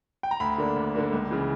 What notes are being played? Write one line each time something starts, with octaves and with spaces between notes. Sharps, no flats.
G5
A#5
D2 B5
D3 A#3 D4
D2
D3 A#3 D4
C#2
C#3 E3